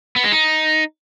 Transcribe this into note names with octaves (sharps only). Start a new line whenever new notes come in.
B3
G#3
D#4